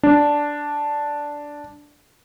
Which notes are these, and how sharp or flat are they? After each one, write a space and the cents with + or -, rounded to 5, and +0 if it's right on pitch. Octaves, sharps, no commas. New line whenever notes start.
D4 -5